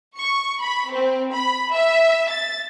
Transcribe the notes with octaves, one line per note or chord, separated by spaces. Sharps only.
C#6
B5
C4
B5
E5
A6